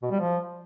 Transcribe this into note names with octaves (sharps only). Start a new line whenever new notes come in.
B2
G3
F3